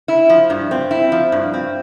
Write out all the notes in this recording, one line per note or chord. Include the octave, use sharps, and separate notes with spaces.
E4
F3
G2
C4
E4
F3
G2
C4